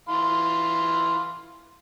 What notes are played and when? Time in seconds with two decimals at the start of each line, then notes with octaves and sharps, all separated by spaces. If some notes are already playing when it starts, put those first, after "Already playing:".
0.09 E3 F5 C6